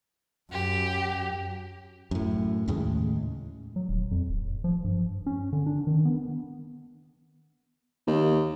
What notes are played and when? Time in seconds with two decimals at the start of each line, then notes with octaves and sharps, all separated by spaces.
0.52 F#2 G4
2.11 F#2 A2
2.68 D#2 A2 C#3 G#3
3.76 F#3
3.89 D#1
4.11 F2
4.29 D1
4.64 F3
4.84 G2
5.26 C#4
5.52 D3
5.66 D4
5.87 D#3
6.05 B3
8.07 D#2